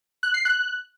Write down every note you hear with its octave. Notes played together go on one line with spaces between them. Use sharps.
F#6
C7
F#6